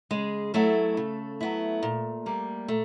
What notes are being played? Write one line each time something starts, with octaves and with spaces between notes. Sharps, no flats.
C#3 G#3 G#4
F#3 A3 B3 E4 A4
C#3
F#3 B3 E4
A#2
G3 A#3
A#2 A3